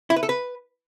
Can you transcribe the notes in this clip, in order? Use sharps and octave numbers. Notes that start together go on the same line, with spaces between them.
E4
B4
A4
B4